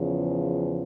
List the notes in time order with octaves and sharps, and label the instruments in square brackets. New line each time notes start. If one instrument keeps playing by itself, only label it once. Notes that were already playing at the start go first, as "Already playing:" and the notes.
Already playing: [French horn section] E2 C#3 F3